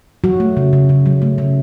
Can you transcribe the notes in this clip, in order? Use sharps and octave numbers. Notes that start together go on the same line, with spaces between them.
F#3 F#4
A3
C#3
C#3
C#3
F#3
A3
C#3